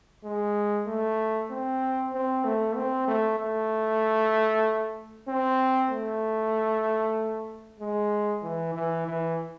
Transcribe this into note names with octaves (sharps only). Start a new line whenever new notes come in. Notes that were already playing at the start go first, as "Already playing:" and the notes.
G#3
A3
C4
C4
A3
C4
A3
A3
C4
A3
G#3
E3
E3
E3